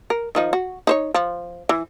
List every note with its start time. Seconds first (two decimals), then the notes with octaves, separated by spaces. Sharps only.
0.10 A#4
0.35 D#3 F3 D#4
0.53 F#4
0.87 D#4 C5 C#5
1.14 F3
1.69 E3